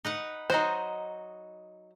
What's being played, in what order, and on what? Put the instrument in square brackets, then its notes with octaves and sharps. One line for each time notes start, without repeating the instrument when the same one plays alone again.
[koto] D#4 B4 F#5
[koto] F#3 F#4 D#5 [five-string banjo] D#4 C5